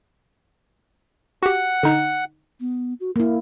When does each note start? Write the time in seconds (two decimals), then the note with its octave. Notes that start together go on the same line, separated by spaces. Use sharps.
1.43 F#4 G4 F#5
1.83 D3 D#4
2.60 B3
3.00 F#4
3.16 A#3 E4 A#4